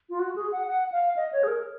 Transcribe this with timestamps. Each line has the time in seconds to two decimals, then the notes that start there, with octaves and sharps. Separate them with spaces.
0.10 F4
0.19 F#4
0.36 G#4
0.52 F#5
0.67 F#5
0.92 F5
1.16 D#5
1.32 C#5
1.43 G#4
1.48 A#4